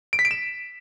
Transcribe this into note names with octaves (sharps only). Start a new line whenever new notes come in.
D7
B6
D7
E7